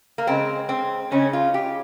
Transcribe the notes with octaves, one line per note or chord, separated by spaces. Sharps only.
A#3
C#3 G#3 C4
C4
C#3 G#3 C#4
F4
G4